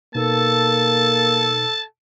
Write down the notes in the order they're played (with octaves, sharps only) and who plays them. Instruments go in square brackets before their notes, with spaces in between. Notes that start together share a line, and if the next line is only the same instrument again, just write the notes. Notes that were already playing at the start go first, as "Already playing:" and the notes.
[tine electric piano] B2 D#4 B4 [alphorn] A#3 [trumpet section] A4 [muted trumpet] A5